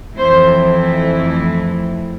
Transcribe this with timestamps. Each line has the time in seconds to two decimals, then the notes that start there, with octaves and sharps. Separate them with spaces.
0.17 F2 E3 A3 C4 E4 C5